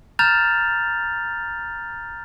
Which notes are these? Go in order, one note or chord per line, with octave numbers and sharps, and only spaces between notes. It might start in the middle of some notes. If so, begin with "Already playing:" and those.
A#5 F6 G6 A6 F7